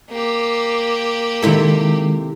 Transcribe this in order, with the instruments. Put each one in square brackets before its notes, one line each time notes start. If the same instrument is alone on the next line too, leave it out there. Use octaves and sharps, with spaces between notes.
[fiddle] A#3 G4
[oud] C3 E4 A4 [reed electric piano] D#3 G#3